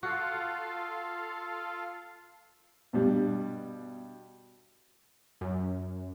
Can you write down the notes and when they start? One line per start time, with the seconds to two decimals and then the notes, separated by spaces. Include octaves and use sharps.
0.03 F4 F#4 A4 F5
2.93 G2 B2 G3
5.41 F#2